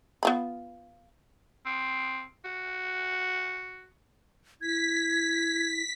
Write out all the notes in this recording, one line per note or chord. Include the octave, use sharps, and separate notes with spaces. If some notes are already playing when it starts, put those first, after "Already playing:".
B3 F4 B5
C4
F#4
E4 G#6 B6